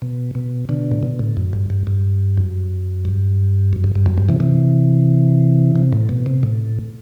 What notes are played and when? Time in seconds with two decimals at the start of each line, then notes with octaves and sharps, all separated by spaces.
0.02 B2
0.35 B2
0.69 B2 D3
0.91 A2
1.03 B2
1.19 A2
1.37 F#2
1.53 G2
1.70 G2
1.87 G2
2.38 F#2
3.05 G2
3.73 F#2
3.84 G2
3.95 G2
4.06 F#2
4.18 G2
4.29 C3 E3
4.40 C3 E3
5.76 C3
5.93 A2
6.09 B2
6.26 C3
6.43 A2